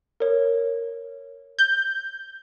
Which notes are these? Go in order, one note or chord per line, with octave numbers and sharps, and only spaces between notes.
A#4 C#5
G6